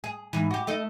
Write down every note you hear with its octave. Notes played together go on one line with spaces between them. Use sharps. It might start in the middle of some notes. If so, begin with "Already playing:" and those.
G#4
G#2 E3
F#4 G4
A3 D#4 A4